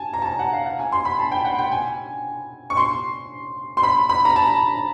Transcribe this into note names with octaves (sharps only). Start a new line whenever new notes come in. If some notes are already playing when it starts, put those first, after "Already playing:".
Already playing: G#5 A5
A#5
A5
A#5
F#5
F5
F#5
G#5
C6
B5
A5
G5
F#5
G5
G#5
C#6
C6
C6
B5
B5
A#5
A5